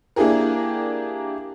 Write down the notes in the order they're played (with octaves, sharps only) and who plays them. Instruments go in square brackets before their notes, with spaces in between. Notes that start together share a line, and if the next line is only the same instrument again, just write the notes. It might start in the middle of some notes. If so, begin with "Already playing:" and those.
[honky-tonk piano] A#3 D4 E4 G4 G#4 A#4